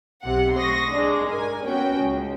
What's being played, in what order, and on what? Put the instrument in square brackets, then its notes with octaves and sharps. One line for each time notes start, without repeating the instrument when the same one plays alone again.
[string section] B1 C3 F#5
C6 C#6 D#6 A#6
G#3 D4
A#4 G#5
B3 C#4 F#4 G5
C#2